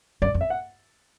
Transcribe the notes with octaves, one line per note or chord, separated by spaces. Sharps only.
F#2 D5
F2
E5
F#5